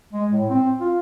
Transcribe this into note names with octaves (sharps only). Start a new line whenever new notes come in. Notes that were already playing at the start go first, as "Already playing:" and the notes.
G#3
A2
C4
F4